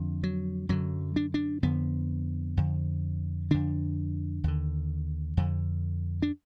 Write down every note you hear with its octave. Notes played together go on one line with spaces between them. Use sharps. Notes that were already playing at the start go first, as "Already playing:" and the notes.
Already playing: F2 D3
F#3
F#2 D3 F#3
D4
D4
F2 D3 B3
F2 D3
F2 D3 D4
D#2 D3
F2 D3
D4